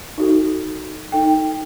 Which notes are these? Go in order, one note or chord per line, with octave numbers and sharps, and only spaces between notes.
D#4 F#4 A4
D#4 A4 G5